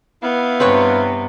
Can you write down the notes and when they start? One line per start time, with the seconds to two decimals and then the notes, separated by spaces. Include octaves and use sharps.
0.23 B3 E4 F5
0.60 G2 C3 C4 B4 C#5